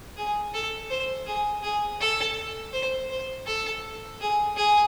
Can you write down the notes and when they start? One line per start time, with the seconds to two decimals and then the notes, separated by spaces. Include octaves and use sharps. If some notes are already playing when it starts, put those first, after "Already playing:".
0.17 G#4
0.54 A4
0.90 C5
1.26 G#4
1.63 G#4
2.01 A4
2.73 C5
3.10 C5
3.46 A4
4.20 G#4
4.56 G#4